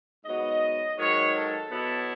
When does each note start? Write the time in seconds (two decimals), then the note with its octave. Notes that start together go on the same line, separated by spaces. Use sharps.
0.24 G#2 F#3 B3 D#5
0.97 G#2 D#3 F#3 C#5
1.34 A4
1.69 B2 F#3 B3 E4